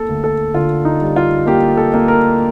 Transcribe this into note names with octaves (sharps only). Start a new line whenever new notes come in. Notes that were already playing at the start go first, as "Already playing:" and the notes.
Already playing: A#3 A4
D2
A4
D3 F4
D#4
G3
F4
A#3 G4
A4
A#3
A#4